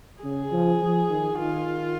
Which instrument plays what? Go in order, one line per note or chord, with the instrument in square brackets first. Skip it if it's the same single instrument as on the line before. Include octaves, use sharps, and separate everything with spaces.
[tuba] C#3 [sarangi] G#4
[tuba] F3
F3
D#3
[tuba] D#3 [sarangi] F4